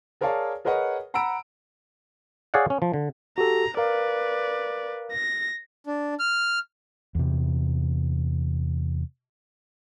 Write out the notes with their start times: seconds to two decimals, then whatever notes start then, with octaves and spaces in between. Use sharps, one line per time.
0.21 G#4 A#4 C#5 D5 F5 A5
0.65 G#4 A#4 B4 C#5 D#5 F#5
1.14 F#5 A#5 B5 E6 D7
2.54 G#4 C#5 D5 F5 F#5
2.70 C#4
2.82 F3
2.94 D3
3.38 F#4 G4 A4 A#5
3.77 A#4 B4 D5 F5
5.12 A#6
5.87 D4
6.19 F6
7.15 E2 C3